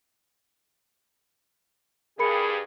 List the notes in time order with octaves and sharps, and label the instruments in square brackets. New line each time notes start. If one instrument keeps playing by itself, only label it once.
[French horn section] G2 [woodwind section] G#4 [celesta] A#4 B5 C#7